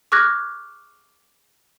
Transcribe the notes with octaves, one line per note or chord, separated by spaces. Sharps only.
C#6 D6 F6 F#6 G#6 A#6